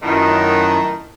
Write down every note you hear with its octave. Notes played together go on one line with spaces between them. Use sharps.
F#2 D#3 A3 B3 E4 F4 A#5